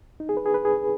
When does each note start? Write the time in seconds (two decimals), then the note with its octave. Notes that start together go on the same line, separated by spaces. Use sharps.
0.20 D#4
0.29 G#4
0.37 B4
0.46 G#4
0.54 B4
0.65 G#4